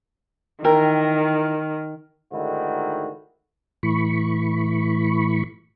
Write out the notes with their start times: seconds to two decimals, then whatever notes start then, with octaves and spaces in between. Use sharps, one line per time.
0.64 D#3 E3 A#4 G5
2.32 G#2 D3 D#3 A3 E4 F#4
3.83 A2 E3 B5 C#6